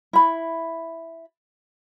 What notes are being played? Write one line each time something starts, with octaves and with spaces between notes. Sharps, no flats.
E4 B5